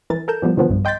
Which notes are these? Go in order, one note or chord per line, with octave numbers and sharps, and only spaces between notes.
E3 A#4 A6
A4 A#4 G6 E7
E3 F3 G3 B3
B2 D3 D#3 F3 F#3 B3
B1 G2
D#5 G5 C6 G6 A6 B6